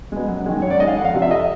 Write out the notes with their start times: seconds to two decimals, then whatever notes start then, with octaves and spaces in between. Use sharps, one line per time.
0.12 B2 G#3
0.28 F#2
0.46 D#3 G#3
0.62 F#2 C#5
0.70 D5
0.79 D#3 G#3 D#5
0.87 F5
0.96 F2 F#5
1.05 F5
1.14 C3 F3
1.22 E5
1.30 F2 D#5